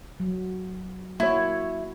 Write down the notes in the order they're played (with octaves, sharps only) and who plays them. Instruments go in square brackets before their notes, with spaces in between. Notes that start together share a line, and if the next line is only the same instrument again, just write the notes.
[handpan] F#3
[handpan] A#3 F#4 C#5 [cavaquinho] E4